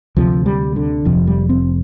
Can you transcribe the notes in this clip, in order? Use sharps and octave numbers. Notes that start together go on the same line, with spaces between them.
D2 C3 F3
G3
D3
F1 F2 C3 F3
G3
C4